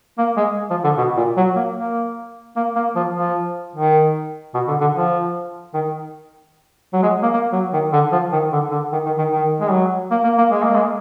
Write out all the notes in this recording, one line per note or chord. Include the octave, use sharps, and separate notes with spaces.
A#3
G#3
F3
D3
B2
A#2
F#3
A#3
A#3
A#3
A#3
F3
F3
D#3
B2
D3
D3
F3
D#3
F#3
G#3
A#3
A#3
F#3
D#3
D3
F3
D#3
D3
D3
D#3
D#3
D#3
D#3
G#3
F#3
A#3
A#3
A#3
G#3
A#3
G#3